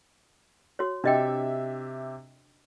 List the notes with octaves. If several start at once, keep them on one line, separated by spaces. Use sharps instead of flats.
F#4 C#5
C3 D4 G4 D#5 E5 G5